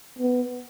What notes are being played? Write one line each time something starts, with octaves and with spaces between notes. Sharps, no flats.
B3